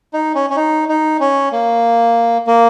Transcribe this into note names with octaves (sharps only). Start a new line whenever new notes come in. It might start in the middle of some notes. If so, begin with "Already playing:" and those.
D#4
C#4
C#4
D#4
D#4
C#4
A#3
A#3